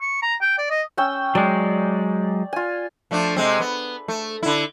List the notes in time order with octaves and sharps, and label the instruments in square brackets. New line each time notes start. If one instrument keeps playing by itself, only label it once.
[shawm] C#6
A#5
G5
D5
D#5
[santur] C#4 G5 E6
[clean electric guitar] F#3 G#3 [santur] D5
[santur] F4 G#5
[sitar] F3 A3 D4
C3 G#3 C4
B3
A3
D3 E4